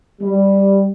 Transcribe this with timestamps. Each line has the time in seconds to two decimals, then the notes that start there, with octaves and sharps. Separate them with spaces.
0.21 G3